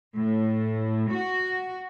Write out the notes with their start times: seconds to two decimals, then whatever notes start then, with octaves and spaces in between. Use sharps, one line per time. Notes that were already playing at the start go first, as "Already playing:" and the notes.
0.15 A2
1.10 F#4